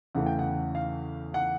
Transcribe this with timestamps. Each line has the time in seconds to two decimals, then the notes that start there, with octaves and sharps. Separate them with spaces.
0.15 E2 C#3 E3 A3 F#5
0.26 G5
0.39 F#5
0.75 F5
1.34 F#5